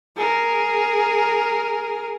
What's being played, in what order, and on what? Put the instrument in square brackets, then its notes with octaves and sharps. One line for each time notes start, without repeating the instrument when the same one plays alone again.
[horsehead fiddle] G#4 A#4